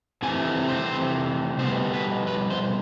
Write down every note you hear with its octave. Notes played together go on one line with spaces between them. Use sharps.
C3 E3 A3 C4 G#5
C5
B2 G3 B3 C5
B4
B4
C5